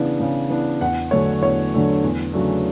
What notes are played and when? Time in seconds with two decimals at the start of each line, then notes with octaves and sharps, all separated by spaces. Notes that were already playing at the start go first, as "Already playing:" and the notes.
Already playing: C#3 E3 B3 D4
0.20 C#3
0.50 E3 B3 D4
0.81 E2 F#5
1.11 D3 F#3 A3 D4 C#5
1.41 E2 C#5
1.73 D3 F#3 A3 D4
2.03 E2
2.33 C#3 F#3 A3 D4